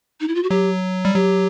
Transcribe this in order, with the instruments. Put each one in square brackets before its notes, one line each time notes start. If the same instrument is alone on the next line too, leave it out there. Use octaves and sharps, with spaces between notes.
[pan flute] D#4
E4
F4
F#4
[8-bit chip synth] F#3 [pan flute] G4
[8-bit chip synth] G3
[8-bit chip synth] F#3 [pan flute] G4